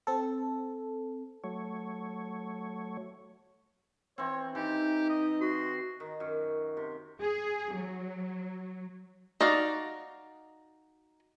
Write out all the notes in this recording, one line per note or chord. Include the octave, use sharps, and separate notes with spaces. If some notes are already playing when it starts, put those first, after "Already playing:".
C4 A4
F#3 A3 C#5
E3 C4 C#5
E3 D#4 G4
D#5
F#4 C6
D#3
F#2
C3
G#4
F#3
D#4 F#4 D5 F5